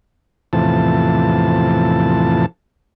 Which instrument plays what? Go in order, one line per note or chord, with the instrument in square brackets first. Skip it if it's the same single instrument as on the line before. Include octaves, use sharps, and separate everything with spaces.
[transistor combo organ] E2 A2 C3 E3 F3 A5